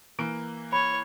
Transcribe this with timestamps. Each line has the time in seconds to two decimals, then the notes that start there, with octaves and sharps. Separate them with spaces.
0.19 E3 A#3 D7
0.73 C#5 B5